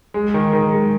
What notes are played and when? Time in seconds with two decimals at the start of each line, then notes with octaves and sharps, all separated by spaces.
0.14 G#3
0.34 D#3
0.53 D#3
0.72 G#3